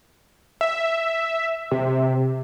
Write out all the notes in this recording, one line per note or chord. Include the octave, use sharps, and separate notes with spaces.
E5
C3